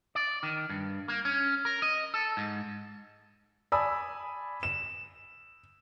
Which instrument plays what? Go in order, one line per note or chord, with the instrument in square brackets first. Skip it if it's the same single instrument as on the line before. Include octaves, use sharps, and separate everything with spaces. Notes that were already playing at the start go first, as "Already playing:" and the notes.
[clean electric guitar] D5
D#3
G2
A#3
C#4
A#4
D#5
A4
G#2
[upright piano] D5 G#5 A5 B5 D#6 E6
E7